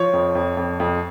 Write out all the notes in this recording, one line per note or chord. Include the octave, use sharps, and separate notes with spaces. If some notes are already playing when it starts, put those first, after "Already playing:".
Already playing: F3 C#5
F2
F2
F2
F2